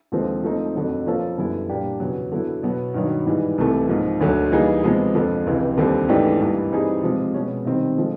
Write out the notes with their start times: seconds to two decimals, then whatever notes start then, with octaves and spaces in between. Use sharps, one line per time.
0.12 D#2 D3 F3 G#3 C4
0.43 F3 A3 C4 D#4
0.75 F2 D3 F#3
1.06 F3 A#3 C#4 F4 A4
1.38 F#2 D3 G3 B3 E4
1.70 A#2 G3 A#3 D4 G4
2.00 E2 C#3 F#3
2.32 D3 F#3 B3 E4
2.63 B2 F#3 B3
2.94 G2 D#3 F#3
3.26 G#2 E3 G3
3.58 C2 C3 E3 A3
3.89 G#2 F3 A#3
4.21 D2 D3 F#3
4.51 E3 G3 A#3 D#4 G#4
4.84 C3 F3 G#3 B3
5.14 F2 D3 F3
5.46 C#2 C3 E3
5.77 D#2 D3 G3 C4
6.09 G#2 E3 A3 D4 G4
6.40 G2 E3 G3 A#3
6.71 E3 G3 C4 D#4 G#4
7.03 C3 F3 G#3
7.34 B2 G#3 C#4
7.65 C3 D#3 G3 C4
7.97 D3 F3 G#3